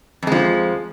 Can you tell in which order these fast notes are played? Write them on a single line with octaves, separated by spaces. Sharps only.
F2 G#3 F3